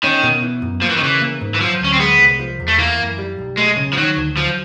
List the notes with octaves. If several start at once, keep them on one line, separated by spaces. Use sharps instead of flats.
D#3 C#4
B2
E3
F#2
F3 A#3
E3
D#3
C#3 E3
A#3
G#2
E3
F3 F#3
D2 C#4
C4
G#3 B3
C2
F3
E2
A3
E3 A#3
F#2
G3
B1
G#3 A3
C#3
F3
D#3 F#3
D2
F3 F#3